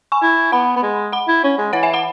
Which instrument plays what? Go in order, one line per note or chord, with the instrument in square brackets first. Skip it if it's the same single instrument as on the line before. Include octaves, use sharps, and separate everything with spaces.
[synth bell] G#5 C#6
[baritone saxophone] E4
[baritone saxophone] B3 [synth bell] F#5 B5
[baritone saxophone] B3
G#3
[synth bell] F#5 B5
[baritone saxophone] E4
C#4
G#3
[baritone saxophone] E3 [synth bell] C#5 F#5
[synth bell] E5 G#5
F#5 B5